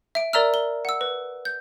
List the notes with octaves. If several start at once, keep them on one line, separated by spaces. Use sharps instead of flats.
E5 D7
A#4 D5 E5 A#5 E6 F6
G7
F#5 E6
B4
G6